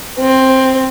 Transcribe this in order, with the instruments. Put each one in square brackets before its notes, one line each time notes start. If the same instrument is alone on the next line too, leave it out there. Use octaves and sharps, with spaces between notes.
[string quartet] C4